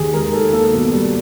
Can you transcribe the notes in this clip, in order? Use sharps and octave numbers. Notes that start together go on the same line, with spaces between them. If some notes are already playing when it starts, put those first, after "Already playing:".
Already playing: D#2 D#3 G4 G#4
G#3 A#4
D#2 A4
A#3 A4
B2
G3